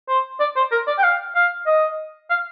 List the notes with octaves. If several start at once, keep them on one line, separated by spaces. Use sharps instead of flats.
C5
D5
C5
A#4
D5
G5
F5
F5
D#5
F5